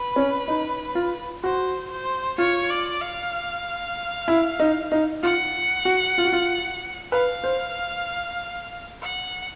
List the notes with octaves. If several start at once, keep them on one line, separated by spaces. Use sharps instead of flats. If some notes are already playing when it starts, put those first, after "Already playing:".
Already playing: B4
C#4
D#4
F4
F#4 C5
C5
F4 C#5
D5
F5
E4
D#4
D#4
F4 F#5
F#4
F4
F#4
F4
B4 F5
C5
F#5